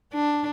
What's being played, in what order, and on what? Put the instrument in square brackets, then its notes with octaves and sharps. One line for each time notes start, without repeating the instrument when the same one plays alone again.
[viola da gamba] D4